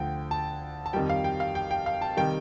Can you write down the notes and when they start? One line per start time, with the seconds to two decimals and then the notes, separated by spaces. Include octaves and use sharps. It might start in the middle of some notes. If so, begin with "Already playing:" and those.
Already playing: D2 D3 F3 G5
0.31 A5
0.86 A5
0.93 F2 D#3 G3 G5
1.10 F5
1.24 G5
1.40 F5
1.55 G5
1.71 G5
1.86 F5
2.02 A5
2.17 C3 D#3 G3 G5